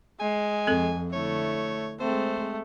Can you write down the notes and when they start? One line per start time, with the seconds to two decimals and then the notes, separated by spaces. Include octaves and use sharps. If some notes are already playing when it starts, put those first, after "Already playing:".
0.20 G#3 G#5
0.67 F2 C4 A4
1.13 D3 A3 E4 C#5
2.00 G#3 A3 C4 C5